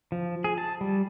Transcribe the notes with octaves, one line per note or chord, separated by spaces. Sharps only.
F3
G#4
A5
G3